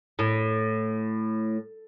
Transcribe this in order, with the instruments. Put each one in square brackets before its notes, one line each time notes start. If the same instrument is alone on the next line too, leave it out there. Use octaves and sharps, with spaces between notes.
[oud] A2